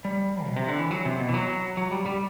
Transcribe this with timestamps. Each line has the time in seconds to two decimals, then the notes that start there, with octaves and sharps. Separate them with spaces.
0.05 G3
0.45 B2
0.56 C3
0.68 D3
0.79 E3
0.91 F#3
1.05 C3
1.20 B2
1.29 E3
1.34 F#3
1.77 F#3
1.91 G3
2.06 G3